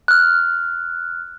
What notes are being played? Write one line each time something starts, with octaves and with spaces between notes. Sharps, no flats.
F6 F#6